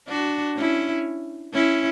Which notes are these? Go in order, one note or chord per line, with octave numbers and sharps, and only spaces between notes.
D4 F#4
C#4 E4
C#4 E4